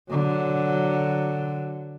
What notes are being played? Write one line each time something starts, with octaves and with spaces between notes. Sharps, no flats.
D3 F#3